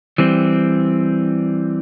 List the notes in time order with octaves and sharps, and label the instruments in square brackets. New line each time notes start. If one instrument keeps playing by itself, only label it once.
[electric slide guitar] E3 G3 C4